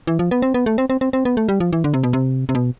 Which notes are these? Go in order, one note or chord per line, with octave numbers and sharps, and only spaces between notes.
E3
F3
B3
C4
B3
A3
C4
C4
C4
C4
B3
A3
G3
F3
E3
D3
C3
B2
C3
C3
B2